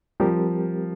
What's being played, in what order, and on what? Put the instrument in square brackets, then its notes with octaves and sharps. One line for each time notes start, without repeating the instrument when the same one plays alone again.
[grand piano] F3 [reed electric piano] G3 C4 G4 A#4